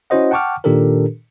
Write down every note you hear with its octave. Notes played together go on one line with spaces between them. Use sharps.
C#4 E4 F#4 C5 D#5 F#5
F#5 G5 A5 C#6 D6 F6
A#2 D#3 D4 G4 A4 A#4